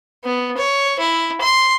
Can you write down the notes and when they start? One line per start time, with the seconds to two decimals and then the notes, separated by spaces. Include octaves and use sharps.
0.25 B3
0.57 C#5
0.99 E4
1.41 C6